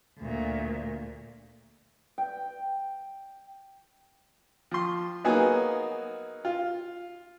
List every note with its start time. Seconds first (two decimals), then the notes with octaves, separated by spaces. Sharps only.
0.18 D2 A#2
2.18 G5
4.71 F3 C6
5.24 F#3 A#3 B3 D#4 F#4 G#4
6.45 F4